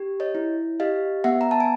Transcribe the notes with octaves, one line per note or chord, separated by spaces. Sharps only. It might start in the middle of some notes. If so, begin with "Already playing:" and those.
Already playing: G4
C#5 D#5
E4
G4 D#5 F5
B3 E5 F#5
A#5
A5
G#5